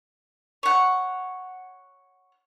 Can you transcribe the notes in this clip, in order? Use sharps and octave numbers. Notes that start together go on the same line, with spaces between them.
C#5 F#5